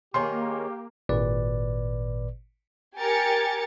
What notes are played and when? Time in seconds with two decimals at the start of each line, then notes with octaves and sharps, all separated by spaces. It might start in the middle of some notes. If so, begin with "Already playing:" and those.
0.14 D#3 A#3 G4 G#4 C#5 C6
1.09 G#1 A#2 B4 D5
2.97 G4 A#4 G#5 A6 C#7